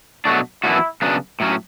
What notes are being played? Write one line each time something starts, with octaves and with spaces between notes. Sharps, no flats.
B2 F#3 A3 D4 F#4
F#2 E3 B3 D4 E4 F#4
C#3 F#3 B3 D4
A2 F#3 C#4